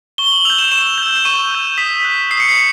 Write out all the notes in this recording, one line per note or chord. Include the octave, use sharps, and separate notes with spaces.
C#6 G7
F#7
E6 G6 F7
E7
C#6 E7
E6 G6
C#6 D#7
E6 G6
D#6 B6
F#6
D#6 C7
C#7
C7